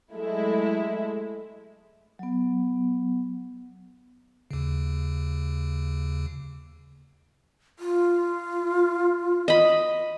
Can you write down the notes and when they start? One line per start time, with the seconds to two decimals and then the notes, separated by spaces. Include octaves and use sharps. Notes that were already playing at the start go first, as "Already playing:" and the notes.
0.14 F#3 G#3 A3 E4
2.19 F#3 B3
4.51 D#2 C#3
7.79 F4
9.48 D#5 B5